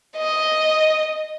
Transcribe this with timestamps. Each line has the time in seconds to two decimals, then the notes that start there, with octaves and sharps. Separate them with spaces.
0.17 D#5